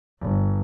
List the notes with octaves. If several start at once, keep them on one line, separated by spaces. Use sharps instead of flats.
G1